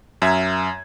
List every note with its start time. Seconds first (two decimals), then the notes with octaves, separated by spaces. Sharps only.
0.22 F#2 E5 A#5 G#6